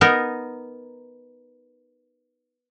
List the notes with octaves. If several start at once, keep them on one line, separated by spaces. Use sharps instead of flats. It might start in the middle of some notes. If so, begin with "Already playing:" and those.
B3 D#4 A#4